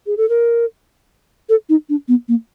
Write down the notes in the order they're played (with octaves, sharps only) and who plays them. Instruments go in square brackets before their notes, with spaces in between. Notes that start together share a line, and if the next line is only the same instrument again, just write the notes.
[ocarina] G#4
A4
A#4
A4
D#4
D4
B3
A#3